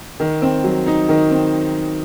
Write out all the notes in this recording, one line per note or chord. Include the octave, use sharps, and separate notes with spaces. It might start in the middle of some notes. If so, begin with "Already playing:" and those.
D#3
C4
F#3
D#4
D#3
C4